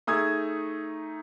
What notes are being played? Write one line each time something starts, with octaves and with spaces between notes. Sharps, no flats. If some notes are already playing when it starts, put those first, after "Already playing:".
A3 D#4 G#4 D#6 E6 G#6